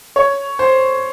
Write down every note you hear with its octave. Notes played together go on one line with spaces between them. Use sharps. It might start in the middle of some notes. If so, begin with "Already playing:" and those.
C#5
C5